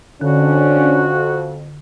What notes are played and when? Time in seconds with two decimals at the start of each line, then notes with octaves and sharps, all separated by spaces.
0.21 F2 D3 C#4 D4 F#4